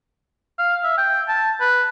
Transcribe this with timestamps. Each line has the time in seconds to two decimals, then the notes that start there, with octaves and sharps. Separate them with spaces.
0.59 F5
0.84 E5
0.98 G5
1.29 A5
1.60 B4